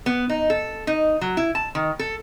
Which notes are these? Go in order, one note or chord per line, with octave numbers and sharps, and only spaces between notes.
B3
D#4
A4
D#4
F#3
E4
A5
D#3
A4